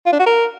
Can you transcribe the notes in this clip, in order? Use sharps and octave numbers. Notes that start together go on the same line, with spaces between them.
F4
D4
F#4
A#4